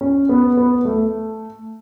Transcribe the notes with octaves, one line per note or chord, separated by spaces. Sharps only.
C#4
B3
B3
A3